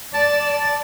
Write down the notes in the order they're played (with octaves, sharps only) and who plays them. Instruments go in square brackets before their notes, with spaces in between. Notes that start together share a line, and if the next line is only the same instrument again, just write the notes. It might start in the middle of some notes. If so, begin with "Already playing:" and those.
[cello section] D5 [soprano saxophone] A5